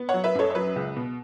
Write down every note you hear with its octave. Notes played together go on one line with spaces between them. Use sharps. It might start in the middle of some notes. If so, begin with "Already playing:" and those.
Already playing: B3
C#5 F#5
F#3
B4 E5
F#2 A4 C#5
C#5
F#3 B4
C#2
B2